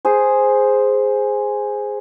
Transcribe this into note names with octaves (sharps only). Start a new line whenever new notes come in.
G#4 C5